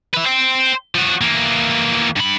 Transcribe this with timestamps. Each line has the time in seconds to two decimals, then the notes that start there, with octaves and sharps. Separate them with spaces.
0.14 B4 E5
0.26 C5 G5
0.95 F3 F#4
1.21 E3 A#3
2.17 G2 B5